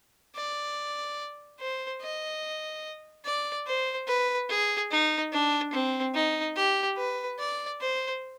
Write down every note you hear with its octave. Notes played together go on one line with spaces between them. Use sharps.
D5
C5
D#5
D5
C5
B4
G#4
D#4
D4
C4
D#4
G4
B4
D5
C5